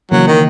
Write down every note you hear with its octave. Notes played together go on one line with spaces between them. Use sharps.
C#3 E3 F#3 A#3
D#3